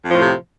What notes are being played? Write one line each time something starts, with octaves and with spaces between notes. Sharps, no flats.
F2 A2 C3 F3